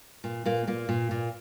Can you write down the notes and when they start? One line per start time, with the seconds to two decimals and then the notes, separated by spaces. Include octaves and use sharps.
0.24 A#2
0.45 A#2 A#3
0.67 A#2 A#3
0.89 A#2
1.11 A#2